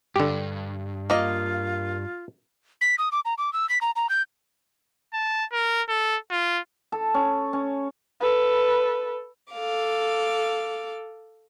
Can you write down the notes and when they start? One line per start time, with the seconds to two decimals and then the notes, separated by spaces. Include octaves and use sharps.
0.16 G2 D3 G4
1.10 A#3 F4 D#5
2.81 B6
2.98 D#6
3.12 D6
3.25 A#5
3.38 D6
3.53 E6
3.69 B6
3.81 A#5
3.96 A#5
4.10 G6
5.13 A5
5.52 A#4
5.89 A4
6.30 F4
6.92 A4
7.14 C#4
7.53 C#4
8.21 A4 B4
9.53 A4 F5 D6